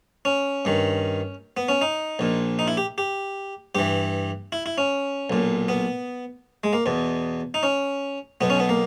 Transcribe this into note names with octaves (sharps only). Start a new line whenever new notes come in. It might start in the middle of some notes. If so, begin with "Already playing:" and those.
C#4
G2 D#3
B3
C#4
D#4
A#1 A#2
D#4
E4
G4
G4
G2 E3 G4
E4
E4
C#4
B1 A#2
B3
G#3
A#3
E2 B2
D#4
C#4
B1 B2 B3
C#4
B3
A#3